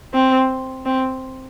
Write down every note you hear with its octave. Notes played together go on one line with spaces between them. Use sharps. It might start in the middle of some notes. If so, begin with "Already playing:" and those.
C4
C4